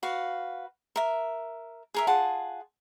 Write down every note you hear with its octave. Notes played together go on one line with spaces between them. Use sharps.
F#4 B4 F5
A#4 E5
G#4 A#4 E5
F4 G#4 F#5 A5